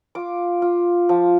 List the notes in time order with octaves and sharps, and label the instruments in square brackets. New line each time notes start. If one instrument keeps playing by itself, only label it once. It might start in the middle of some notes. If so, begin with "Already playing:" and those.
[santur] F4 D6
F4
F3